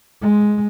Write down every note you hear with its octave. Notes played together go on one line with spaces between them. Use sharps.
G#3